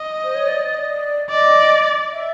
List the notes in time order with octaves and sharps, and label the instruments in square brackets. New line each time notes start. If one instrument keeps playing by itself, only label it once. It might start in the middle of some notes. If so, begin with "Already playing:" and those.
Already playing: [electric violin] D#5
[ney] C5
C#5
D5
D5
[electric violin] D5 [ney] D#5
[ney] E5